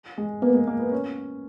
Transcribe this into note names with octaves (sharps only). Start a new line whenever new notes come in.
G#3
A#3 B3
G#3
A#3
B3
C#4